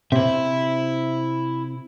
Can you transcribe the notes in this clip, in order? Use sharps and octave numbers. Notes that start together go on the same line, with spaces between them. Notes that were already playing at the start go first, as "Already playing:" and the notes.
C3 E4 E5